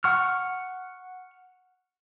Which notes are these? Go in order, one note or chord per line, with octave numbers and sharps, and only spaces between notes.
F#5 C#6 F6